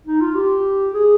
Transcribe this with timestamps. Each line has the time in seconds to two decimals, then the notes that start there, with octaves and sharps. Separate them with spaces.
0.07 D#4
0.20 F4
0.35 G4
0.94 G#4